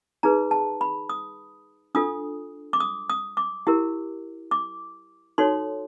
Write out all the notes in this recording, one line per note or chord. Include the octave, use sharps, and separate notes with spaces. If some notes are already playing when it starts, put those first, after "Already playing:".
D#4 G#4 B4 A#5
A5
B5
D#6
D4 F4 A4 D#6
D6
D#6
D#6
D6
E4 G4 A#4
D6
D#4 F#4 A4 C#5 C6